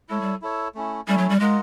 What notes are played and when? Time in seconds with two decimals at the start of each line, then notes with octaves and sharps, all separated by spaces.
0.09 G#3 E4 A4 C#5
0.21 G3
0.42 E4 A4 C#5
0.75 A3 C#4 E4
1.07 G3 A3 C#4 E4
1.18 F#3
1.29 G3
1.40 G#3 F4 A#4 D#5 F#5